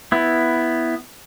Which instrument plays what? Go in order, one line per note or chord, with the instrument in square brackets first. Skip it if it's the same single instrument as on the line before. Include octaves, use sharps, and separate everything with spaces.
[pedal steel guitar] B3 E4